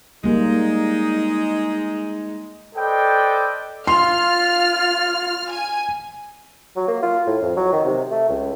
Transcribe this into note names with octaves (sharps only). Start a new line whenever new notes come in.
G3 G#3 A#3 D#4
A4 B4 C5 D5 D#5 G5
F4 C6 F6
G#5
F#3
A#3
F4
A2
F2
F#3
D#3
C3
A3
C#2